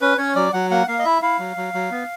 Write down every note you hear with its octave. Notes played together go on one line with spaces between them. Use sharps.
C#4 B4
C#4 C#5
F#3 D5
F#3 F#5
A#3 F#5
A#3 F5
D#5
E4 E5
E4 F5
F#3
F#3
F#3
B3